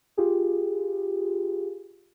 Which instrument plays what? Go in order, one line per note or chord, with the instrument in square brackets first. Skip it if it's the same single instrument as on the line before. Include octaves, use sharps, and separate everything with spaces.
[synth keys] F4 G4 G#4